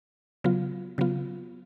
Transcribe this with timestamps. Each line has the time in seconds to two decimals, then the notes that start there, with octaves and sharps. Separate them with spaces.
0.44 C#3 F#3 B3 F4
0.98 C#3 F#3 B3 F4